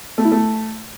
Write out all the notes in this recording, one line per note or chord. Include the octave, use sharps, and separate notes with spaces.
A3
E4
A3